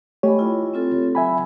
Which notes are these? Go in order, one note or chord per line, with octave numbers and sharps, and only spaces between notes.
A3 G4 C#5 D#5 G#5 B5
E4 F4
C4 F4 A4
F#3 E5 G#5 B5